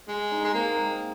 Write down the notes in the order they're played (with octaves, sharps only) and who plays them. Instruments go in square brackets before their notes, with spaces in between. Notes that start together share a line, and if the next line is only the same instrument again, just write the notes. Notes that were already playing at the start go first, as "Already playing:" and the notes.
[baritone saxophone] G#3 [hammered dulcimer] G#4
[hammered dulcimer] D#4
[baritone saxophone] G#3
[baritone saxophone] A#3 [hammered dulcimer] C4
[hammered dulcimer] G#3